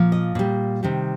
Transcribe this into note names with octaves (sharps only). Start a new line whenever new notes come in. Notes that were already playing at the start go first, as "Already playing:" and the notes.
Already playing: A#2 F3
D#5
A#2 G3
C3 D#3 G3